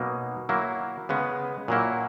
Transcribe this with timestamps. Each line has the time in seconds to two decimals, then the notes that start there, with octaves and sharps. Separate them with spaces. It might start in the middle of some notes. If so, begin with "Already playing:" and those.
Already playing: B2 F#3 A#3 D#4
0.49 F#3 A#3 E4
1.09 C#3 G#3 B3
1.68 A#2 F#3 A#3 E4